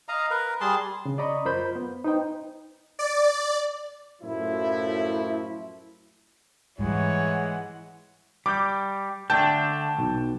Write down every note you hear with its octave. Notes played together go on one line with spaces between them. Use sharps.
D#5 F5 A#5
A#4 B4
G3 G#4 A5 C6
C#3
D5 D#5 A#5 B5 C#6 D#6
F#2 F4 A#4 C5 B5 G6
B3
D#4 B4 C5 G5
D5
F#2 A2 F3 A3 E4
G#2 E3 G3 G#3 C#5 F#5
G3 D6 G6
D3 A3 D4 G5 A5 G6
B1